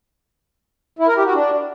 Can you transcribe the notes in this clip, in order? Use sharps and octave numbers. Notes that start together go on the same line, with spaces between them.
E4
A#4
G4
F#4
D4